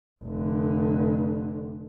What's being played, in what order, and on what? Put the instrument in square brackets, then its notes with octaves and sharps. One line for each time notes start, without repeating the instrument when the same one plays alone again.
[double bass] F1 D3